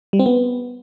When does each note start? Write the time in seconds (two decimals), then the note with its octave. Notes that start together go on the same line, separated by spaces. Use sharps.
0.13 G3
0.20 C4
0.26 B3